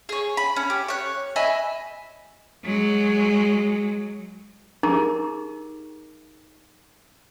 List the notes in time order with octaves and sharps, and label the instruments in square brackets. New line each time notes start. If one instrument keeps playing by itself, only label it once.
[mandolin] G#4 C#5
B5
C#4
G4
C#5 F#6
D#5 E5 G#5 B5
[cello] F#3 G#3
[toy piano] D#4 G4 G#4 A#4 A#5 D6